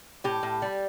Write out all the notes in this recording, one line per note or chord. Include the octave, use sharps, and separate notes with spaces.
A2 G4
A2
G3